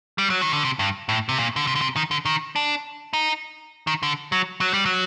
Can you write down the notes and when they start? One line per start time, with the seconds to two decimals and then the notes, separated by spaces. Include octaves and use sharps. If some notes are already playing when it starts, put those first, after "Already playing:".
0.18 G3
0.30 F#3
0.41 D#3
0.53 D3
0.65 C3
0.79 G2
1.09 A2
1.29 C3
1.38 A#2
1.56 D3
1.67 C3
1.75 D3
1.81 C3
1.96 D#3
2.11 D3
2.25 D#3
2.56 D4
3.13 D#4
3.87 D#3
4.03 D3
4.32 F#3
4.61 F#3
4.73 G3
4.85 F#3